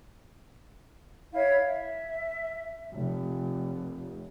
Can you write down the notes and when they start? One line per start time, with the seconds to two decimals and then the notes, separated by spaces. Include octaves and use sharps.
1.33 E4 C#5 F5 G#6
1.68 E5
2.93 F1